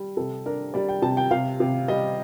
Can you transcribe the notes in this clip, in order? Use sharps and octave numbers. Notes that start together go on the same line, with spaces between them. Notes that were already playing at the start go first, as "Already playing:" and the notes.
Already playing: G3
C3 A4
D4 A#4
G3 D5
G5
C3 A5
G5
C3 F5
C3
G3 D#5